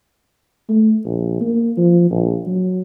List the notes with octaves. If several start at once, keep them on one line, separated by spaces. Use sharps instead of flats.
A3
A#1
A#3
F3
A#1
F#3